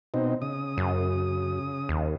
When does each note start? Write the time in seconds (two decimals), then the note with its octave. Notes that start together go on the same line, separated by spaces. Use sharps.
0.14 B2 C4 D#4
0.42 C#3 D#6
0.78 F#2
1.89 D#2